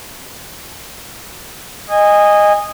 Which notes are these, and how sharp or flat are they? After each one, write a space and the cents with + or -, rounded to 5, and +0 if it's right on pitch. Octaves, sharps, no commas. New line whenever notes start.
D#5 -10 G#5 -20